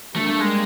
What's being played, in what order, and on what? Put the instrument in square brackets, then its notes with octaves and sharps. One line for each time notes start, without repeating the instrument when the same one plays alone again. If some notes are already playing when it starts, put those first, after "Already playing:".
[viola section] G3 A#3 D4 G4 [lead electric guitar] A3
[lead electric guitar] A3
G#3